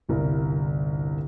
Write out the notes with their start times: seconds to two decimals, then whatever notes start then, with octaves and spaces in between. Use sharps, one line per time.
0.09 G1 C2 E4 A#4